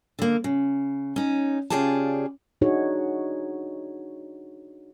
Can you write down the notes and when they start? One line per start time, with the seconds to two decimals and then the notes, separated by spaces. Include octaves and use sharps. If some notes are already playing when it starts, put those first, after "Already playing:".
0.19 D3 A#3
0.44 C#3
1.16 C#4 D#4
1.70 C#3 F4 G4 G#4 D5 A5
2.61 D4 D#4 F#4 G#4 C#5